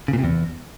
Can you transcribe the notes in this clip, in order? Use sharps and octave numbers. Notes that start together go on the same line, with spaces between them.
C#3
A#2
C3
E2